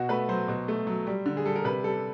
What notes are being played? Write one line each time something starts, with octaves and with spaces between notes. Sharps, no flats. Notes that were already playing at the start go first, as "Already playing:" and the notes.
Already playing: B2 F#4
A3 B4
F#3 C5
B2
A3
F#3
G3
D3
G#4
G3 A4
A#4
C3 B4
G3 A4